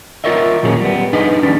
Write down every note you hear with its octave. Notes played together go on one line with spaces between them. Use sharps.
F4 F#4 A#4 C#5 D#5 E5
D#2 A#2 F#3 C#4 G#4 C#5
G3 B3
D4 D#4 G#4 B4 D#5
D#2 G3 C#4 D4